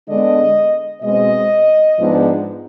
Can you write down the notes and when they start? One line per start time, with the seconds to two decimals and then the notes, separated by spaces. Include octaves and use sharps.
0.08 D3 G#3 B3 D4 D#5
1.02 B2 G#3 C4 D#5
1.97 G#2 F3 B3 D4